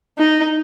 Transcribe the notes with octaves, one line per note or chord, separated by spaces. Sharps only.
D#4